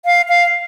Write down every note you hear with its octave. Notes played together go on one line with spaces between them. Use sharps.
F5
F5